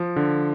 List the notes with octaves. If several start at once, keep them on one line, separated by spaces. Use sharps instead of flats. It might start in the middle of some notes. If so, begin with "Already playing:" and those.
Already playing: F3
D3